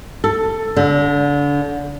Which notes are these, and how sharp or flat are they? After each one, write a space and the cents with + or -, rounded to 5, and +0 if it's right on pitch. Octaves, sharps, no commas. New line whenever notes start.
A4 +10
D3 -30